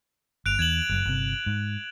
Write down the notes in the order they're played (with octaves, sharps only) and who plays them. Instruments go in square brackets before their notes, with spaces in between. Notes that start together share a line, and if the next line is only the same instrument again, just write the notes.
[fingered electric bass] G1 [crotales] F#6 D7 F7
[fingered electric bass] E2 [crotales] G#6 E7 F#7
[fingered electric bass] F#1 F#2
G1 C3
G#2